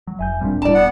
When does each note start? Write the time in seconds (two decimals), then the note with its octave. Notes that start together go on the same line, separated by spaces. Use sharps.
0.07 F#3
0.19 F1 E5 G#5 G6
0.41 C#2 A#2 G3 C4 D4
0.62 D#1 A2 G3 D4 E4 D5 A5
0.75 A#2 B3 F#5